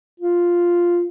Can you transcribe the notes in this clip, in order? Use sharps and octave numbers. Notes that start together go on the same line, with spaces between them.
F4